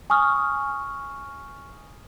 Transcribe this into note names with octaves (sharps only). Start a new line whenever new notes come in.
G#5 C#6 D#6 F6